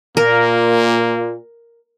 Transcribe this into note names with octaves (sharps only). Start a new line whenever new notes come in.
A#2 A#3 A#4